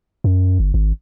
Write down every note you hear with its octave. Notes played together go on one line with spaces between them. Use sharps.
F#2
G1
G#1